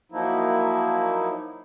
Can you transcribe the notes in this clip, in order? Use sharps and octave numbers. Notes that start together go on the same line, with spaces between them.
F3 F#3 A#3 D#4 E4